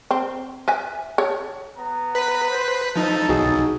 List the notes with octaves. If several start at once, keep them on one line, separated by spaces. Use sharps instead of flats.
C4
B4 E5 G#5
A4 C#5
B3 A#5
B4 B6
C5
F3 D#4 A4 A5
B1 D#4 F#4 G#4